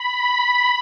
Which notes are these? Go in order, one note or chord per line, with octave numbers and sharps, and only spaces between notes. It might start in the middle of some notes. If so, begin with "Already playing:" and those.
Already playing: B5
B5